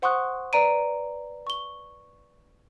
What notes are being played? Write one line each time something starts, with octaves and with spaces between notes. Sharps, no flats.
C5 F#5 C6 C#6 D#6 F#6
B4 D5 A#5 D7 D#7
C#6 G7